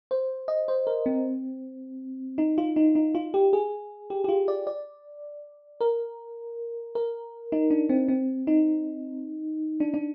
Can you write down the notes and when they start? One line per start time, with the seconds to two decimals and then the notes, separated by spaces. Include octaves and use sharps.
0.11 C5
0.48 D#5
0.68 C5
0.87 A#4
1.06 C4
2.38 D#4
2.58 F4
2.76 D#4
2.95 D#4
3.15 F4
3.34 G4
3.53 G#4
4.10 G4
4.24 G4
4.28 F4
4.48 D5
4.67 D5
5.81 A#4
6.95 A#4
7.52 D#4
7.71 D4
7.89 C4
8.08 C4
8.47 D#4
9.80 D4
9.94 D4